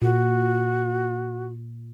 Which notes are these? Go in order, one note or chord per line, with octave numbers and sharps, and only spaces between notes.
A#2 F#4